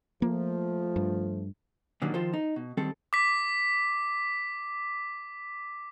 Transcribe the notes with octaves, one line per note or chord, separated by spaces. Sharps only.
F3 A3 A#3
G2
A#2 D3 D#3 F#3 G3 A#3
D#3 F3 F4 A4 C5
D#4
B2
D#3 G3 C4 A4
D6 B6